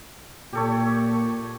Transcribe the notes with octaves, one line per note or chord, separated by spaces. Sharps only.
A#2 G4 A4 C#5